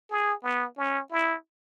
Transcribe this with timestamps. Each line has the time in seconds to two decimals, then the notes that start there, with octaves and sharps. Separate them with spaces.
0.10 G#4
0.43 B3
0.77 C#4
1.11 E4